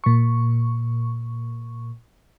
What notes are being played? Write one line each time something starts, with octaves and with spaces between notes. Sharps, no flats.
A#2 C#6